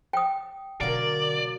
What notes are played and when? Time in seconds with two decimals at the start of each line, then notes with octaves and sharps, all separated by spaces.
0.13 G5 D#6
0.81 B2 D3 F#3 A#3 A#4 D5